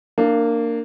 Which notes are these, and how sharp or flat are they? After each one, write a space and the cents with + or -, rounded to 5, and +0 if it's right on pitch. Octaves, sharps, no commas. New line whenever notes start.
A#3 -15 D4 +10